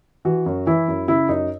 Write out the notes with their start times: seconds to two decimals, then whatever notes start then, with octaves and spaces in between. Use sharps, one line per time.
0.25 E3 F#4
0.46 F#2
0.67 E3 E4
0.88 F#2
1.08 C#3 E4
1.29 F#2 D#4